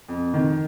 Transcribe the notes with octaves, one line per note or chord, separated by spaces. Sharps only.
F2
D#3